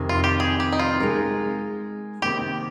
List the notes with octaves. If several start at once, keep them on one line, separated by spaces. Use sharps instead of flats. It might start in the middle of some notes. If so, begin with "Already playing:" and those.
Already playing: F2 C3 D#3
F4
G4
G#4
G4
D#4
F4
G#3 D#4 A#4
C3 D#3 A#3 G4